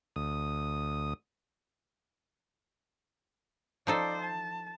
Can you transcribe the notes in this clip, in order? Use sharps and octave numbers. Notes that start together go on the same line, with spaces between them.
D2 D#6
F3 D#4 A4 C5 D5
A5